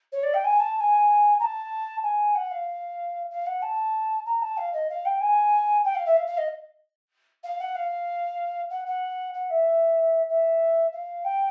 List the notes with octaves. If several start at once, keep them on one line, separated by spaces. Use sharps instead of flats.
C#5
D5
G5
G#5
A5
A5
G#5
A#5
A5
G#5
F#5
F5
F5
F#5
A5
A#5
A5
F5
D#5
F5
G5
G#5
G5
F5
E5
F5
F5
D#5
F5
F#5
F5
F#5
F#5
F#5
E5
E5
F5
G5